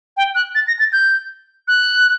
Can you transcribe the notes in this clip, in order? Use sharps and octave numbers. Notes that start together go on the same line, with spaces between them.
G5
F#6
A6
A#6
A6
G6
F#6